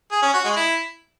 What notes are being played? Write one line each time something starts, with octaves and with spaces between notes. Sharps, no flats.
G#4
C#4
F#4
G#3
E4